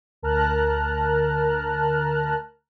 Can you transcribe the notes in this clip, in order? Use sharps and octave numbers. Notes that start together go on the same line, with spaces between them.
D2 A#4 A5 A#5 F6 F#6